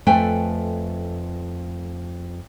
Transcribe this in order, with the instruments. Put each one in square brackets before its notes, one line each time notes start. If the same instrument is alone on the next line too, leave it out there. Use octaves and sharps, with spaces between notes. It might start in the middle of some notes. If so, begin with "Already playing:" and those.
[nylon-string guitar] F2 A3 B4 G5 G#5